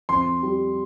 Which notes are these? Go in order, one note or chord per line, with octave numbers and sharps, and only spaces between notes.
F2 C6
G3